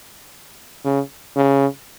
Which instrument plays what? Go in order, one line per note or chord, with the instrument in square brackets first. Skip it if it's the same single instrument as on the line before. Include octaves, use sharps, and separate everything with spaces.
[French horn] C#3
C#3